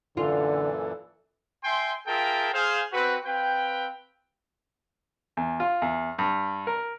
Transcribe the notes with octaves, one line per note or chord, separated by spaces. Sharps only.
F#2 A#2 D3 E3 F4 A4
E5 G5 G#5 C6
F4 G#4 A#4 E5 G5 A5
G#4 C5 F5
C4 F#4 B4
C4 B4 F5 G5
E2
F4
E2
G2
A#4